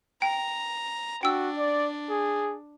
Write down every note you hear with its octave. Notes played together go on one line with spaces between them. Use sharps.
G5 A#5
D4 F#4 G5 E6
D5
G#4